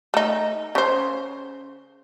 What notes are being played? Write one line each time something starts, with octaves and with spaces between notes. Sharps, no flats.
A3 D#4
C#3 C5